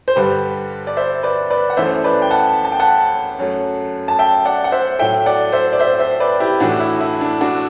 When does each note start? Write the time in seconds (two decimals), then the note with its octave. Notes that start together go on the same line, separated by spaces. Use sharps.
0.08 C5
0.16 G2 D3 G3 G4 B4
0.87 D5
0.97 C5 E5
1.23 B4 D5
1.50 B4 D5
1.70 F#5
1.77 F#2 E3 A3 C5 E5
2.04 B4 D5
2.22 G5
2.31 F#5 A5
2.65 A5
2.72 G5
2.80 F#5 A5
3.39 F#2 F#3 A3
4.08 A5
4.19 E5 G5
4.45 D5 F#5
4.64 F#5
4.72 C5 E5
4.99 A2 F#3 A3 E5 G5
5.26 D5 F#5
5.53 C5 E5
5.73 D5
5.79 C5 E5
5.99 C5 E5
6.20 B4 D5
6.40 E4 G4
6.60 A2 E3 A3 D4 F#4
6.80 E4
7.00 E4
7.21 D4
7.41 D4 F#4